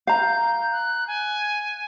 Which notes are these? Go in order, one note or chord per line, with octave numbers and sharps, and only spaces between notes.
F5 A#5 G6
F#6
G#5